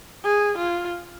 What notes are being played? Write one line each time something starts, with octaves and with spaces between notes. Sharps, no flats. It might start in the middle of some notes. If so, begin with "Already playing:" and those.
G#4
F4